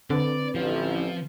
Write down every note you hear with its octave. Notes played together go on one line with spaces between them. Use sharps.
D3 C4 B4 D5
A1 F3